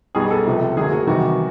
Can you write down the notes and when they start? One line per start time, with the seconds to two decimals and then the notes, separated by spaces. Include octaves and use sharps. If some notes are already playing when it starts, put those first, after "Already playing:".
0.15 B1 B2 G3 G#4
0.30 A4
0.45 C#2 C3 F3
0.77 D2 D3 F#3 A#3 G#4
0.92 F#4
1.07 E2 C3 D#3 G3 F#4